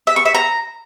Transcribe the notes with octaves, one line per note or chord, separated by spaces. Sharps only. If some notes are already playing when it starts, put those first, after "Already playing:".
E5
C#6
E5
A#5